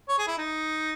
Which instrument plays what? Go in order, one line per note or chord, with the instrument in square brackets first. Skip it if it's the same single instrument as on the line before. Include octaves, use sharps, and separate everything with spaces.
[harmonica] C#5
G#4
E4
D#4